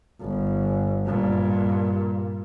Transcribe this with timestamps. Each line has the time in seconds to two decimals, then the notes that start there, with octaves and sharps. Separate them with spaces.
0.21 G1
1.06 G2 A#2